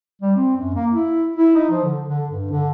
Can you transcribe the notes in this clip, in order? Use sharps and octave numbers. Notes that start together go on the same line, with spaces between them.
G3
C4
F#2
A#3
E4
E4
D#4
F3
D3
D3
G2
D3